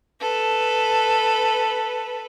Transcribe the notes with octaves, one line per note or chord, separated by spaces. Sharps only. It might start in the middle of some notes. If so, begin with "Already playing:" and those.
A4 B4